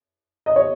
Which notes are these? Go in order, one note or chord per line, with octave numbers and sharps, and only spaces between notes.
D#5
C#5